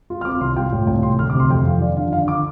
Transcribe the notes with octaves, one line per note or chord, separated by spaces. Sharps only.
F4
F6
C4 D6
C2 C6
F4 G5
A2
C2 G5
C2 C6
D2 F6
D6
C3 C6
F2 G5
F2 F5
F3 D5
D3 F5
D3 F5
D6